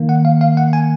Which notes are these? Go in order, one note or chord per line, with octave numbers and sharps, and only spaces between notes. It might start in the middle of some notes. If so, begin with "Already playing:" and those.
Already playing: D#3 A#3
F#5
F5
F5
F#5
G#5